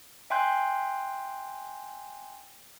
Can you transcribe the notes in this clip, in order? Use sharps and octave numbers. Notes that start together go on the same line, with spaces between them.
E5 G5 G#5 C6 F#6 G6